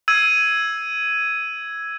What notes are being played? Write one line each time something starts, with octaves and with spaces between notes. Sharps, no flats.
E6 G#6 D#7